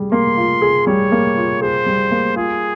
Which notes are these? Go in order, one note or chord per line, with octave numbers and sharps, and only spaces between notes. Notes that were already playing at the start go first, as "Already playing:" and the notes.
Already playing: G3 G#4
A#3 C6
F4
G#4
G3 C#5
A#3
F4
G#4 C5
G3
A#3
F4 G#4